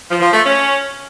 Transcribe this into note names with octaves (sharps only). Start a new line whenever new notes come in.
F3
F3
A3
C#4